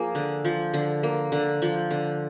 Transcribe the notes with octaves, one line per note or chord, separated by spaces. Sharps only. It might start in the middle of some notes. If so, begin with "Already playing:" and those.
Already playing: F3 A#3 G#4
D3
F3
D3
A#3
D3
F3
D3